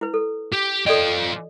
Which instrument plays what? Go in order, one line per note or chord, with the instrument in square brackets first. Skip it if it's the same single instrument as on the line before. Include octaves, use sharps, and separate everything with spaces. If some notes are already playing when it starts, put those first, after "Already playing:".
[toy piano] E4 B4
A4
[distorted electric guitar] G4
[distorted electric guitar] F3 G5 [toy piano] A4 D5 D#5